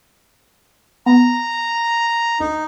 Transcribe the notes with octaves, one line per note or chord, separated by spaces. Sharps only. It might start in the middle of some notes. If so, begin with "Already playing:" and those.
B3 A#5
D2 D#4